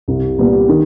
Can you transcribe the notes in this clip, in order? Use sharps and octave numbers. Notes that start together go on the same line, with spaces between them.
C2
A#2 G3 B3
D#3